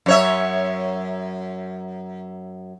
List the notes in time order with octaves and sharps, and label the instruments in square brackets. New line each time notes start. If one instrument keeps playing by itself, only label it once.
[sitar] F#2 C#5 E5